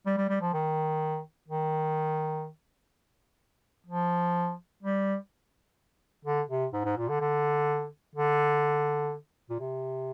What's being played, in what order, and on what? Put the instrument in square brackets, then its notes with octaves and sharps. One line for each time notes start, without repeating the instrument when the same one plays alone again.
[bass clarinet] G3
G3
G3
F3
D#3
D#3
F3
G3
D3
C3
G#2
G#2
A#2
D3
D3
D3
A#2
C3